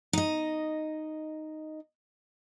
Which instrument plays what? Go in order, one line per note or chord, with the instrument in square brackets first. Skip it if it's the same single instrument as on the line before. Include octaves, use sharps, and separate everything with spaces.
[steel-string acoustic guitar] D#4 D#5